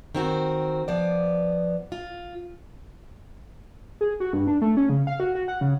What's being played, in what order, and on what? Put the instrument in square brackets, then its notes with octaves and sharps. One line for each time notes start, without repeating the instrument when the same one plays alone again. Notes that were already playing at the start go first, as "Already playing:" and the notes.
[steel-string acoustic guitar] D#3 C4 F#4
F3 B3 D5
F4
[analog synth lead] G#4
F#4
G2
D4
A3
C#4
C#3
F5
F#4
F#4
F#5
C#3